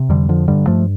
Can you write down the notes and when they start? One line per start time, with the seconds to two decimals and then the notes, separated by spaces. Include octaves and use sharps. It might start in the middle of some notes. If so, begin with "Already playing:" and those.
Already playing: C3
0.09 F2 D3 G3
0.29 D3 F3
0.48 G2 D3 G3
0.67 G2 F3 A3